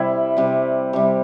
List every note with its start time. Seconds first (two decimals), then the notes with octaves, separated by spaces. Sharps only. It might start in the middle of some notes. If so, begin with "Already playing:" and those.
Already playing: C3 G3 E4
0.37 C3 G3
0.93 C3 G3